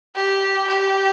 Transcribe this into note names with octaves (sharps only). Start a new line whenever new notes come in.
G4
G4